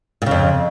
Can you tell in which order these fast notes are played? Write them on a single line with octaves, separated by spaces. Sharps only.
A#2 C#3 F2